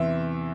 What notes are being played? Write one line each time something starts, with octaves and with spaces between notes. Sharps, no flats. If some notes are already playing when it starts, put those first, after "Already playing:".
Already playing: E2 C3 E3 E5